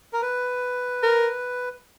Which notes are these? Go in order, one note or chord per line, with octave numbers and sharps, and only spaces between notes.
A#4
B4
A#4